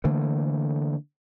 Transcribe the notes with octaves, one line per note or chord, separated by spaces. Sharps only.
D3 E3 A3 A#3